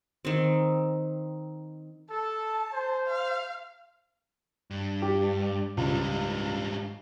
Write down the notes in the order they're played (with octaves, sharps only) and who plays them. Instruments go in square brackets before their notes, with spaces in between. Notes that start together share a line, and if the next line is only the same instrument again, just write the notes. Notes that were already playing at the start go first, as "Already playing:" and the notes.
[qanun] D#3 C4
[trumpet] A4 [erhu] A5
[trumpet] C5
[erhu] F5
[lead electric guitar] G2
[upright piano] G4
[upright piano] C#2 [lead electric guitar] G#2 G3